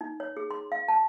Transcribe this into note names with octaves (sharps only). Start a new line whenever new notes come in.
D#4
C#5
G#4
C6
F5
A5